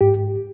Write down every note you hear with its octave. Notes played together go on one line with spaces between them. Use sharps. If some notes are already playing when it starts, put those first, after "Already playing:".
G#2 G4